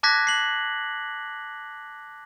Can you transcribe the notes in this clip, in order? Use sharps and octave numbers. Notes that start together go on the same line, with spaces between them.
A5 D6 F#6 G#6 A#6 B6
C7 F#7